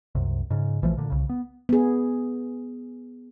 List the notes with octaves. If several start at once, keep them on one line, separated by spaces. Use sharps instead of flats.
C2 F#2 C3
G#2 C#3
A#1 E3 F3 A3
A#2 D3
C2 C#3
B3
B3 G#4